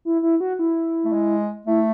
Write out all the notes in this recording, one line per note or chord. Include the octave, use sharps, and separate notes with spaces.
E4
E4
F#4
E4
A3
G#3
A3 E4